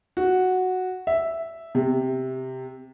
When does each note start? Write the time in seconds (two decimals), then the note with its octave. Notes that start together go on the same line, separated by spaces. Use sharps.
0.17 F#4
1.07 E5
1.75 C3